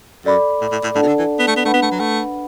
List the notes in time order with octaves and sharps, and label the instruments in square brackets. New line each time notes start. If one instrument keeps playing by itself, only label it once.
[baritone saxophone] F#2 [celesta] A4 D5 B5 D6
[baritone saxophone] A2
A2
A2
[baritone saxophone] A2 [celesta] D4 A4 D5 F#5 A5
[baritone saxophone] B2
D3
E3
B3
A3
B3
[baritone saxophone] A3 [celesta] D4 B4 F#5 B5
[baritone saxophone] B3
A3
F#3
A3